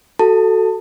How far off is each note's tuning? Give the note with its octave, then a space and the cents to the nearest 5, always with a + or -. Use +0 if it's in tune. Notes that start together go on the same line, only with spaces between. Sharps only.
F#4 +15 A4 +0 A5 +30